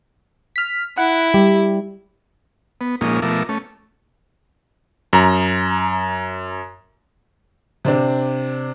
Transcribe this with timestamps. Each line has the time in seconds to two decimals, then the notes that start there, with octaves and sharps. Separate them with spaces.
0.56 F6 B6
0.98 E4 F#5
1.34 G3 G4
2.81 B3
3.01 A#2 F3 G#3 A#3 C#4 D#4
3.22 B2 F3 A3 A#4 E5 D6
3.49 A3 C#4
5.13 F#2 A#5
7.85 C3 C4 D4